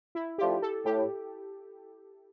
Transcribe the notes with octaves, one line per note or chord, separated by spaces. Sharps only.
E4
F3 A3 D4 F4 G4
A4
A2 G4